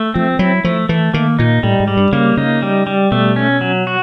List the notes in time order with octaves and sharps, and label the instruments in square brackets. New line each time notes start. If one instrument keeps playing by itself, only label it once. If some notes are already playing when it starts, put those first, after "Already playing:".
Already playing: [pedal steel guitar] A3
[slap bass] F3 [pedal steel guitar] C4
[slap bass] F#3 [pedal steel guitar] E4
[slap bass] F3 [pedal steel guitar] A3
[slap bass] E3 [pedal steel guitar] A3
[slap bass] D#3 [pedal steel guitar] A#3
[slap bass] A#2 [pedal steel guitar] D#4
[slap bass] A2 [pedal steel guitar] G3
[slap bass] G#2
[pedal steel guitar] G3
[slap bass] G2
[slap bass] C#3 [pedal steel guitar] A#3
[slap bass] C#3 [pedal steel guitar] D#4
[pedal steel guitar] G3
G3
[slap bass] B2 [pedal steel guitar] A3
[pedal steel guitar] C#4
F#3
F#4